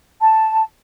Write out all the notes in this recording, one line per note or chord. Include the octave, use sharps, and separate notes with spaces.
A5